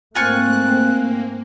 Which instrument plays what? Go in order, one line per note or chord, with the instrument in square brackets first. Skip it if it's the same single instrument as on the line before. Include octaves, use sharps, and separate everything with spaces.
[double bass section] G#2 A3 C4 [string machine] A#3 [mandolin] F4 G#5 C#6 [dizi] F#6